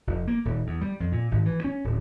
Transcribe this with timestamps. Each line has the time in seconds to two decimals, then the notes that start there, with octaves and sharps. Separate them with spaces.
0.07 F1
0.27 A#3
0.45 D#1
0.67 E2
0.81 G3
1.00 F2
1.12 A#2
1.31 G#1
1.46 E3
1.64 C#4
1.84 D1